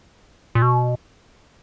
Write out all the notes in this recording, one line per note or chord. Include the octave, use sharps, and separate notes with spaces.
A#2
B2